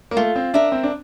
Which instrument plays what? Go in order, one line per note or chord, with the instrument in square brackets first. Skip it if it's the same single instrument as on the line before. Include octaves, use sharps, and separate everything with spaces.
[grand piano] A#3
[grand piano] A3 [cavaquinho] F4
[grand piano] C4
[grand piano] D4 [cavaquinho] A#4 E5
[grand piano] C4
D4